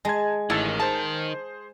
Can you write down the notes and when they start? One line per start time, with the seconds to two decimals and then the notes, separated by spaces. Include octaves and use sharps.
0.05 G#3 G#5 A5 G#6
0.50 A1 D#3 E4 A4
0.80 G#4 C5 A5